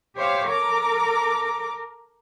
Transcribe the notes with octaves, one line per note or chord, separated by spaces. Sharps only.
G4 C5 C#5 E5 F5
A4 A#4 A#5 D6